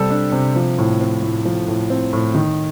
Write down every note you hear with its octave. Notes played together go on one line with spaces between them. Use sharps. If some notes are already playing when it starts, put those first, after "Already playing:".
Already playing: C3 G3 A4
D4
C3
F3
A2
C4
A2
F3
A2
C4
A2
D#3